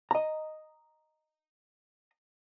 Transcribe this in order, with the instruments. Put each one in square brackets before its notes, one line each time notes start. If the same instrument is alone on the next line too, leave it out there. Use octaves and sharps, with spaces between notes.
[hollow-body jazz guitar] D#5 A#5